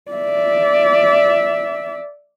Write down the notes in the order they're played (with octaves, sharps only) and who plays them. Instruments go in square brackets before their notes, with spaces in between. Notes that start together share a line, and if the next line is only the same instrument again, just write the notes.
[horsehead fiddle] D5 E5